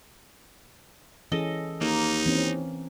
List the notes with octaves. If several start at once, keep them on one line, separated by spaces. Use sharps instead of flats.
E3 C#4 G#4 A4 D#5
D#2 A#3 D#4
E3 C4 C#4